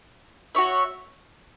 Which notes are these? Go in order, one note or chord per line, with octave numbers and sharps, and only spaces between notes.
F#4 C#5 E5